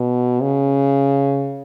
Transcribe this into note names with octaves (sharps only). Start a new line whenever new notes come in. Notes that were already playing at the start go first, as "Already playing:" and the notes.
Already playing: B2
C#3